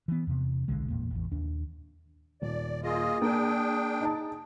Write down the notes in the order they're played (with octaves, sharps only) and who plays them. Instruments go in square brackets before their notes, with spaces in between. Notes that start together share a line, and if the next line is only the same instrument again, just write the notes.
[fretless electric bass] E3 B3
E2 C3
D1 B1 D3 G#3
G#1 E2 A#2 A#3
A1 E2
D#2 D4
[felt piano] D#1 [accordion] D5
[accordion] A#3 F4 D#5 [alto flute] G#4
[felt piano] A#3 [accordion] D4 G5
[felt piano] D#4 A5